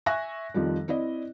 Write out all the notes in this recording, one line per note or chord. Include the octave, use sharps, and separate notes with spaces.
E5 G#5 C#6 F#6 A#6
F2 D#3 F3 G3
C4 E4 D5 D#5